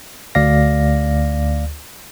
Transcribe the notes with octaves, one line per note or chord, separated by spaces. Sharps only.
D2 D5 F5 A#6